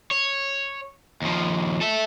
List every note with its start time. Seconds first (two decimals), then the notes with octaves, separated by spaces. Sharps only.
0.11 C#5
1.22 D#2 F3
1.81 A4 E5